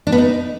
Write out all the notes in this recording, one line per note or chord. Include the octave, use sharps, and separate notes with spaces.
D4
B3
D#4